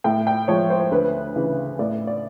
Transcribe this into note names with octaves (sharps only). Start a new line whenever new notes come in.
A2 G5
G5
F3 G#3 C#5
C5
D2 B4
C#3 E3
A2 D5
D5